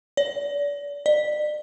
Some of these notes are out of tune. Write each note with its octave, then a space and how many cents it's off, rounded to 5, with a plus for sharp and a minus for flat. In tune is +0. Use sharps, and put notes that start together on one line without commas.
D5 -35
D5 +40